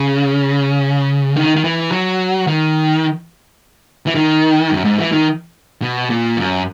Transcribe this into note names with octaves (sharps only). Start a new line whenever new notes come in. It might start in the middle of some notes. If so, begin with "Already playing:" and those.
Already playing: C#3
D#3
D#3
E3
F#3
D#3
E3
D#3
F#2
G#2
E3
D#3
B2
A#2
F#2